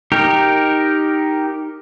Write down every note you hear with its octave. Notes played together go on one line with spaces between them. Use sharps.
D#4 G4 A#4